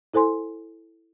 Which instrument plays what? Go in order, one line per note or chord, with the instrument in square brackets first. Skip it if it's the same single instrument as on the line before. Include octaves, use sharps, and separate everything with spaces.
[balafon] E4 A4 C5 G#5 C6